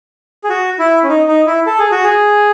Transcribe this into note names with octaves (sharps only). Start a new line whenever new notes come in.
G#4
F#4
E4
C#4
D#4
D#4
E4
A4
G#4
F#4
G#4